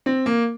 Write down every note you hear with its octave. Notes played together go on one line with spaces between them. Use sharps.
C4
A#3